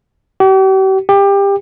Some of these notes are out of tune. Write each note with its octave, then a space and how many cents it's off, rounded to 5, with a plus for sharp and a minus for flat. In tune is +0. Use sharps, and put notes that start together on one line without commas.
G4 -40
G4 +25